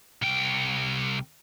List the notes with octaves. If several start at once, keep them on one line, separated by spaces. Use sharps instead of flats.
C2 G5